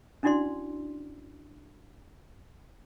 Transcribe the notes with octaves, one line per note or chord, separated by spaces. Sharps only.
C#4 D4 E4 F#4 D5 C6